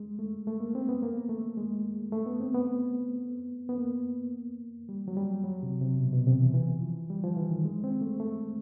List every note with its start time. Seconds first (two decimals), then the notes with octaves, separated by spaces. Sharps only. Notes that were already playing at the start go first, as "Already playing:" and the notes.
Already playing: G#3
0.19 A3
0.47 A3
0.60 A#3
0.75 C4
0.89 B3
1.02 A#3
1.29 A3
1.58 G#3
2.12 A3
2.26 B3
2.40 C4
2.54 B3
3.69 B3
3.78 A#3
4.89 G3
5.08 F#3
5.17 G3
5.44 F#3
5.63 C3
5.81 C3
5.99 B2
6.13 B2
6.27 C3
6.41 E3
6.54 E3
6.82 F3
7.10 G3
7.24 F3
7.37 E3
7.50 D#3
7.65 G#3
7.84 C4
8.01 A3
8.20 A3